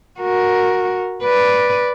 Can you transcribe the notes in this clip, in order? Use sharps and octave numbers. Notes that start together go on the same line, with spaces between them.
F#4 A#4
B4 D5